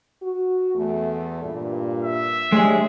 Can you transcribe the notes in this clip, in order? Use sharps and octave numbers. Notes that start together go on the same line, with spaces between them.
F#4
E2 A3
G2 A#2
E5
G#3 D4 G4 G#4 C#5